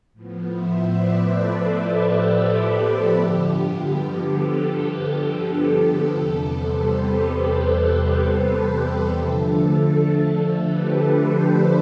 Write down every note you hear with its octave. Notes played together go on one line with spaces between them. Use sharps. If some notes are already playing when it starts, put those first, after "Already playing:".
A2 F3 B3
C5 E5
B4 D5
A4 C5
A4
G4
G2 D3 F3 B3
G4
A4
G4
A4
E2 C3 G3 B3 A4
A4 C5
G4 B4
G4 B4
G4
A4
D3 F3 A3
A4
G4 B4
A4 C5
B4 D5